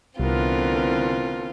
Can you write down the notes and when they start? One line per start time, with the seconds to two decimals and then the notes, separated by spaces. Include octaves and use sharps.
0.19 C2 D3 E3 A3 B3 C4 F4 A#4